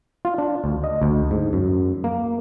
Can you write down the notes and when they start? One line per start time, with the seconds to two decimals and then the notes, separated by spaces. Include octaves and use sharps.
0.25 F4
0.38 D4
0.64 D2
0.84 D#5
1.02 D2
1.31 G#2
1.53 F#2
2.04 A#3